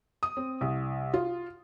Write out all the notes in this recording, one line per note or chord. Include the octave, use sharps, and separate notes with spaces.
D#6
C4
C2
F4